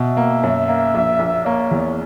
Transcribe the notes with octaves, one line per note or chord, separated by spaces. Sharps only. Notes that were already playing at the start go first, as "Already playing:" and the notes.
Already playing: B2 E5
A#3
F#2
A#3
A#1
A#1
A#3 C#5
E2